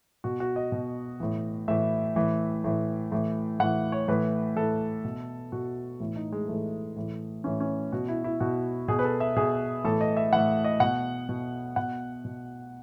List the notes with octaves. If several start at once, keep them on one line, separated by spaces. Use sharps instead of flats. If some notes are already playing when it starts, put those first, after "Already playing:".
B2 F#4
F#4
D#5
B2
A2 E3
A2 E3 E5
A2 E3
A2 E3
A2 E3
A2 E3 F#5
C#5
A2 E3 B4
A2 E3 A4
B2
B2 F#4
A2 E3
D#4
G#3
A2 E3 A3
A2 E3
A2 E3 C#4
C#4
B2 F#4
E4
E4
B2 F#4
B2 G#4
B4
A4
E5
B2 G#4
A2 E3 A4
D#5
E5
A2 E3 F#5
D#5
B2 F#5
B2
B2 F#5
B2